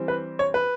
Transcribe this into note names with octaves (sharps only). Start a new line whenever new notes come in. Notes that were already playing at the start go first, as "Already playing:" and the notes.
Already playing: E3 G3 C4
B4
C#5
B4